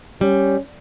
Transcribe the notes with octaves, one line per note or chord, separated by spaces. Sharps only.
G3 C#4